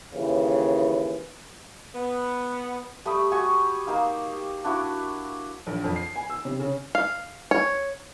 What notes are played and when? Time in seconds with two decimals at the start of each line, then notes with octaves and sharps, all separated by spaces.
0.14 D#2 C#3 E3
1.94 B3
3.05 G3 A3 B5 D#6
3.32 F#4 G4 G#5 C#6
3.87 A#3 D#4 G4 F5
4.64 D4 E4 F#4 D5
5.67 A#1
5.84 F2
5.96 C7
6.16 G#5
6.30 E6
6.45 C3
6.59 C#3
6.95 F5
7.51 C#5